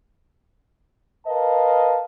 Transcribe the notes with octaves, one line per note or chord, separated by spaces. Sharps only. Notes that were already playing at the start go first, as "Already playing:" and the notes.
A#4 B4 D#5 F5 A5